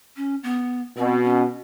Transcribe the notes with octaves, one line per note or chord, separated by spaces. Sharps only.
C#4
B3
B2 C4
C#4